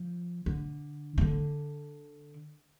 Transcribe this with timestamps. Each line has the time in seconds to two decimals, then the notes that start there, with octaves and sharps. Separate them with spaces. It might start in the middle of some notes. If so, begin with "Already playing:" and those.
Already playing: F3
0.46 D3
1.18 E3
1.21 D3